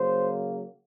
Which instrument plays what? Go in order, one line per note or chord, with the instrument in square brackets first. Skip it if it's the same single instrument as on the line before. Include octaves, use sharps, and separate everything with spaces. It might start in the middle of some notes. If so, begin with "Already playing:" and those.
Already playing: [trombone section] C#3 F#3 A#3 C5